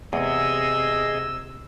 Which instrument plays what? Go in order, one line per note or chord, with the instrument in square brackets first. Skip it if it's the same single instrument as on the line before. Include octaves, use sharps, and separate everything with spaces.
[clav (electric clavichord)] E2 [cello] C3 [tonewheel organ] G#4 D#5 [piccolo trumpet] E6